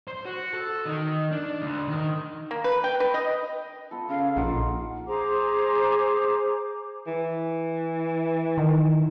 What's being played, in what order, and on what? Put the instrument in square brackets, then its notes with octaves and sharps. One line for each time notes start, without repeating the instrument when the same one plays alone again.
[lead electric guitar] C5
F#4
A4
D#3
D4
D2
D#3
[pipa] A#3
B4
G5
B4
D#5
[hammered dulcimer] B3 F4 A4
[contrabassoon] C#3 [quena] F5
[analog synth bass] A#1 [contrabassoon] C#3 [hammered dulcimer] D#4 F4 D6 [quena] F#5
[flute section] G#4 C5 A#5 D6
[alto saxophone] E3
[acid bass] D#3